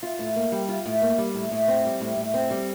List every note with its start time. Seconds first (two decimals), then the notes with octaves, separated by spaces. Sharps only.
0.03 F4
0.19 A2
0.36 A#3
0.52 G3
0.69 F4
0.86 A2
1.02 A#3
1.18 G3
1.35 A2
1.51 A2
1.68 C4
1.85 G3
2.01 A2
2.17 A2
2.34 C4
2.51 G3